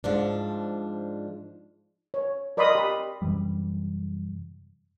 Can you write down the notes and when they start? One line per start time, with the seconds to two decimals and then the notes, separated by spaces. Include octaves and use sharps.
0.04 G#2 F3 D4
2.14 C#5
2.57 A#4 D5 D#5 B5 C6 D#6
2.75 G4 B5
3.22 F#2 C3 E3 G3